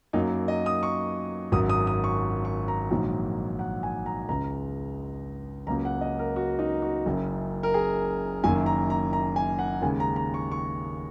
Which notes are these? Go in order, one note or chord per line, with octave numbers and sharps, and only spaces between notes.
F#2 F#3 A#3 D#4
D#5
D#6
C#6
G#1 F#2 F#3 D#6
D#6
D#6
C#6
C#6
A#5
A#1 G#2 D#3 F#3 A#3
F#5
G#5
A#5
C#2 C#3 G#3 A#5
C#2 C#3 F#3 A#3 A#5
F#5
D#5
A#4
F#4
D#4
F#4
F#1 F#2 C#3
A#4
G#4
F#1 F#2 D#3 A#3 G#5
A#5
A#5
A#5
G#5
F#5
D#2 C#3 G#3 G#5
A#5
A#5
C#6
C#6